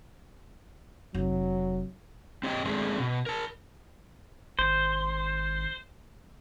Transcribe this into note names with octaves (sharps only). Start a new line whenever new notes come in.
F1 F#3
C4 G4 D5 D#5 G5
G#3 A3 C4 D4 G#4
B2
A#4 A5
G#1 C5